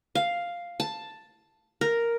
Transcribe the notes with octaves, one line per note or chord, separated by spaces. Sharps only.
F5
A5
A#4